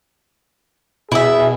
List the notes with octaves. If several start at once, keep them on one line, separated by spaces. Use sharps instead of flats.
B2 E4 G#4 E5